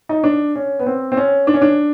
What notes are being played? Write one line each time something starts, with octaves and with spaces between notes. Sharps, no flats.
D#4
D4
C#4
B3
C4
C4
C#4
D4
C#4
D4